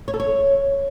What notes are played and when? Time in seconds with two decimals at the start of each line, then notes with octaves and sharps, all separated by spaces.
0.08 C#5
0.14 A4
0.20 C#5